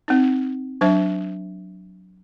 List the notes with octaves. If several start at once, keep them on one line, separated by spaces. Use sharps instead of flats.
C4 D#4
F#3 D4 C5 E5